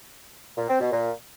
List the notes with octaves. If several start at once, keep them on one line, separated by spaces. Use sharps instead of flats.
A#2
C4
B2
A#2